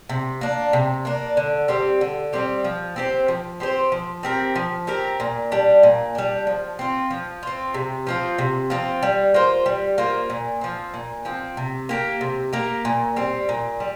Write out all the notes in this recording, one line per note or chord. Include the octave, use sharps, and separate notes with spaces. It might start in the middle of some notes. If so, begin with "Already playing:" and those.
C3
A#3 D4
C3
A#3 D4
D3
G3 C4 G4
D3
G3 C4 G4
F3
C4 G4 C5
F3
C4 G4 C5
F3
C4 G4 A#4
F3
C4 G4 A#4
A#2
G3 D4
A#2
G3 D4
F3
C4 F4
F3
C4 F4
C3
F3 C4 F4
C3
F3 C4 F4
G3
A#3 F4 C5
G3
A#3 F4 C5
A#2
F3 C4
A#2
F3 C4
C3
A#3 G4 A#4
C3
A#3 G4 A#4
A#2
G3 C4
A#2
G3